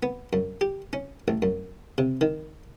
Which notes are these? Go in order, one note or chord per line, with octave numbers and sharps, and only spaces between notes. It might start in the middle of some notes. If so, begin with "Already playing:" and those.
B3
F#2
G4
C#4
A1
F#2
C3
D#3